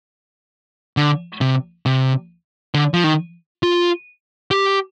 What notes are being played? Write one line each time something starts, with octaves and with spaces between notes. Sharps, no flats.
D3
C3
C3
D3
F3
D#3
F4
G4